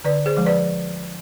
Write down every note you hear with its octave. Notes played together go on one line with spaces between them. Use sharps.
D3 B4 D5
G#4 C5
F3 G#3
B4 D5